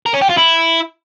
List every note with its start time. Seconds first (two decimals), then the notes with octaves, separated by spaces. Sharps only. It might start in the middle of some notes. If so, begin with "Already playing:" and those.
0.06 A#4
0.14 C#4
0.22 G4
0.29 F4
0.37 E4